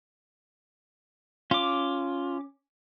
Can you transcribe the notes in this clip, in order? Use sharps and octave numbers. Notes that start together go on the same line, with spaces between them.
C#4 F4 D6